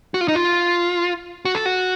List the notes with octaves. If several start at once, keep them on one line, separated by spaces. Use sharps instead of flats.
F#4
F4
D#4
F4
F#4
A4
F#4